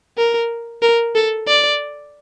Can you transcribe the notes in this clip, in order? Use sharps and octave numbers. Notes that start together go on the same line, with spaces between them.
A#4
A#4
A4
D5